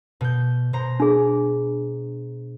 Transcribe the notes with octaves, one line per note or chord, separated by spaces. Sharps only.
B2 G6
B2 C5 A#5
D4 G#4